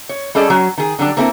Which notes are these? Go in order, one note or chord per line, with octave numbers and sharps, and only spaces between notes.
C#5
G3 C#4 G#4 A4 D5 D#5
F#3 C#4
D#3 G#4
D3 F#3 G3 D4
A#3 C4 E4 A4 A#4